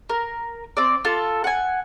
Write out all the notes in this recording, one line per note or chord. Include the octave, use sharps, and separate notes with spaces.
A#4
C4 D5
F4 A4
F#5 G#5